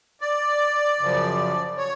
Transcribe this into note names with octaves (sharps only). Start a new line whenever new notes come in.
D5
F#2 C#3 F3
C#5